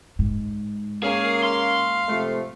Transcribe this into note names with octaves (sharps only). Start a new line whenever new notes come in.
G#2
A#3 C#4 G#4 F5
F5 C6
C3 F3 A3